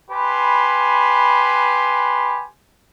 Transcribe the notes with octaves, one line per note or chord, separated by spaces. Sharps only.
G4 B4 G#5 B5 C6